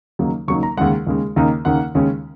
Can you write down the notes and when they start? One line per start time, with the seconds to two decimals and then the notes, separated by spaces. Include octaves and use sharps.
0.19 D#2 C#3 F#3 A#3 D#4
0.48 D#2 C#3 F#3 A#3 D#4 C#6
0.63 A#5
0.77 D#2 C#3 G#3 F#5
1.07 D#2 C#3 G#3
1.36 D#2 C#3 A#3 D#4
1.65 D#2 C#3 A#3 D#4 F#5
1.95 D#2 C#3 G#3 C#4